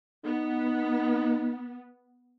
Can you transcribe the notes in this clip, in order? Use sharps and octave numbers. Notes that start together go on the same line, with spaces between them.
B3 D#4